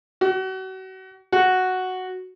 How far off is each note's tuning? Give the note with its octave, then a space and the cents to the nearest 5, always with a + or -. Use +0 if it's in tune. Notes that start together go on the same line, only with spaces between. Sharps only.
F#4 +35
F#4 +0